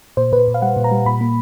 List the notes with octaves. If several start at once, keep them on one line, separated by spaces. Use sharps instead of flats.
A#2 C5
A#2 B4
A#2
F5
G3 F#5
A#2
A#5
G3
A#2 B5
A#3